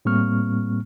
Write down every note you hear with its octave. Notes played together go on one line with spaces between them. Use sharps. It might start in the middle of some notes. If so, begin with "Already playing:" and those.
A2 G3 A#3 C4 C#6 F6